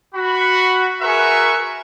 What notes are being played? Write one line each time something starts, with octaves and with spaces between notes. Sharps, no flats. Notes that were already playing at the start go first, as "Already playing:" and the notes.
F#4 B5
F#4 G#4 A#4 B4 E5 C#6